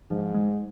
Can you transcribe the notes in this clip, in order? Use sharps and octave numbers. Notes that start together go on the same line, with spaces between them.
G#2 F3
G#3